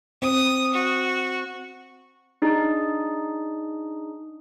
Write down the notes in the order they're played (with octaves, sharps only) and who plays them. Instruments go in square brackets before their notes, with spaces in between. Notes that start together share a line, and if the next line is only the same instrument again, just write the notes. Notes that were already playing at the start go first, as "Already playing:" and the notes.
[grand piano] C4 [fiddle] D#6
[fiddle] F#4
[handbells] D4 D#4 G#4